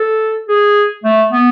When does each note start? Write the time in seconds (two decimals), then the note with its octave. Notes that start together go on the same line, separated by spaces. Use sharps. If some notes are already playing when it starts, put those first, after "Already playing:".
Already playing: A4
0.49 G#4
1.04 A3
1.31 B3